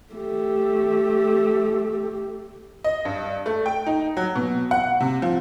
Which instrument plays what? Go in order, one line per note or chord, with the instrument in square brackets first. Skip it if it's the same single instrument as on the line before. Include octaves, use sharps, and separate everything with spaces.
[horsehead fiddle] A3 G4
[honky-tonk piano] D#5
G2
A3
G5
D#4
F#3
B2
F#5
C3
F3